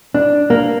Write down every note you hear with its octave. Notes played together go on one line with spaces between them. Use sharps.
D4
A#3